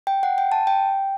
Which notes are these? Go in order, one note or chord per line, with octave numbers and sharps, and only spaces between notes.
G5
F#5
G5
A5
G5